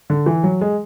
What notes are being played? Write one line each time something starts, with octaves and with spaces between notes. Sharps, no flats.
D3
E3
F#3
G#3